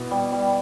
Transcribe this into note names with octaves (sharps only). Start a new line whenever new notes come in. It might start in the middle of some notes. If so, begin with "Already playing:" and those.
Already playing: B2 E3
G3
G3